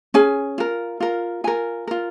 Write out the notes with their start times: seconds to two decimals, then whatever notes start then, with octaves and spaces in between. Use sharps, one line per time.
0.14 C#4 G#4 G#5
0.58 F4 A#4
1.00 F4 A#4
1.44 F4 A#4 G#5
1.88 F4 A#4